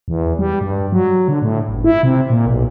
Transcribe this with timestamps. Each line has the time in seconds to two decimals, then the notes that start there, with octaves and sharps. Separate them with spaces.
0.08 E2
0.39 G3
0.61 G2
0.92 F#3
1.28 D3
1.42 A2
1.69 G1
1.84 E4
2.03 C3
2.30 A#2
2.46 B1